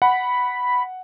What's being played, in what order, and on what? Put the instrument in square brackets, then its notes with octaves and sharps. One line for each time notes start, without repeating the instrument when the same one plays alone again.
[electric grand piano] F#5 [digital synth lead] B5